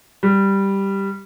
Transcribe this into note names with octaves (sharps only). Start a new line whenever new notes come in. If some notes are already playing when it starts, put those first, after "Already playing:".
G3